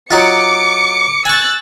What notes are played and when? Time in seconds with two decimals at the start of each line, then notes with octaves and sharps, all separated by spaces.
0.11 F#3 D#4 F4 D6 C#7
1.25 G#5 C#6 E6 F#6 A6